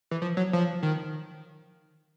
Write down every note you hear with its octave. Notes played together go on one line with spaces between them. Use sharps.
E3
F3
F#3
F3
D#3